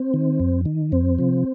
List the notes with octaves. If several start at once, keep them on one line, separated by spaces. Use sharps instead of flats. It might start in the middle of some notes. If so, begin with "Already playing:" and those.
Already playing: C4
D#3
F2
D#3
F2 C4
C3 F3